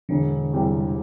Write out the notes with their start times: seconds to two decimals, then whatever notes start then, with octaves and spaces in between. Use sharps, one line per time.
0.09 E1 D3
0.53 E2 C3 G3